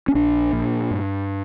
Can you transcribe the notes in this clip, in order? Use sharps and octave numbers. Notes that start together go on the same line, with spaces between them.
C#4
A#1 D4
A#2
G2